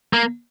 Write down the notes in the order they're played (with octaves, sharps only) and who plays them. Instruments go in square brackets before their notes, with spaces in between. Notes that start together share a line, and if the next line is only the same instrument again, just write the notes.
[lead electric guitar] A#3